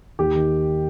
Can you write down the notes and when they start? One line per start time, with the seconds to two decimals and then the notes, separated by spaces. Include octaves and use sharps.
0.19 D#2 G4
0.35 D#3